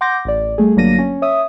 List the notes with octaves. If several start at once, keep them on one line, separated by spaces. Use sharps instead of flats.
F#5 C6 D6 G6 A#6
A1 D5
G3 A3 G#4
G1 F#3 A#3 D4 A#6 D#7
C#4
C#5 E5 D#6